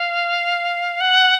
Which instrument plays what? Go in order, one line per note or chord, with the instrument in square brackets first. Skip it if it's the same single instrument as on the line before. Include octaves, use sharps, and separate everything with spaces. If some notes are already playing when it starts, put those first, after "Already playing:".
Already playing: [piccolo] F5
F#5